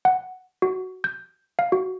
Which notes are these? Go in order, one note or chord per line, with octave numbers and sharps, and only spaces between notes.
F#5
F#4
G6
F5
F#4